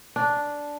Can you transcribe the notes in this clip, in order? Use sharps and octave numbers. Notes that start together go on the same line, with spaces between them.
D4